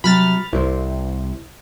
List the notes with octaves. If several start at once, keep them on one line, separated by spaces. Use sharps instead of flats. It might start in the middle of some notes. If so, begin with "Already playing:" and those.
C3 F#3 B5 F6 A6
C2 E4 C5